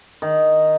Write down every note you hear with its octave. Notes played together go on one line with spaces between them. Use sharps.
D#3